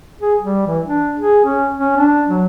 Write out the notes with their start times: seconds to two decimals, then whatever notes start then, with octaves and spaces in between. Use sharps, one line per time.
0.21 G#4
0.41 G3
0.67 E3
0.85 D4
1.19 G#4
1.45 C#4
1.78 C#4
1.98 D4
2.28 F#3